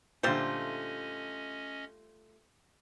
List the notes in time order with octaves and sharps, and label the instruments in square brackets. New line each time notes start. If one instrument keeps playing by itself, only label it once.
[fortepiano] A#2 D3 [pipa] G3 C5 [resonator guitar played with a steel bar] A3 F4 [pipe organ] C#4 D#5